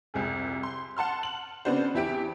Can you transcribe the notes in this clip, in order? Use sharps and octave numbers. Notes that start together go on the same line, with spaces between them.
C2 F2 G#4
C6
F#5 A5 C6 F6
F#7
C#3 B3 C4 D4 F#4 C5
E2 E4 G4 D7